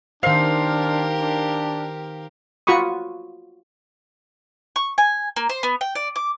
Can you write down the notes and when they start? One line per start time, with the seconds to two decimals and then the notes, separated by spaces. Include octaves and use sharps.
0.23 D#3 D4 G4 A#4 C5 F5
1.19 D4
2.67 F4 F#4 B5 C#6 D#6
4.76 C#6
4.98 G#5
5.36 A#3
5.49 C5
5.63 B3
5.81 G5
5.95 D5
6.16 D6